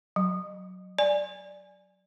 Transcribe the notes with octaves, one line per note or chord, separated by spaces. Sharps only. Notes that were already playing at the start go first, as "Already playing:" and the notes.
F#3
D5 G#5